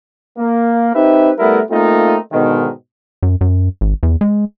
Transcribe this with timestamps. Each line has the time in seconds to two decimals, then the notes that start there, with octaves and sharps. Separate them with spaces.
0.39 A#3
0.94 C4 D#4 G4 B4 E5
1.39 G3 A3 B3 E4 A#4
1.71 A3 A#3 C4 D#4 F4
2.32 G#2 B2 D3 D#3
3.23 F#2
3.41 F#2
3.81 G#1
4.03 E2
4.21 G#3